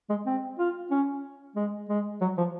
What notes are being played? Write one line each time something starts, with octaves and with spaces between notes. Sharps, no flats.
G#3
C4
F4
C#4
G#3
G#3
F#3
F3